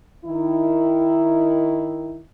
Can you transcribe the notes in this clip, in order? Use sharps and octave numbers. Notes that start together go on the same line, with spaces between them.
D#3 E4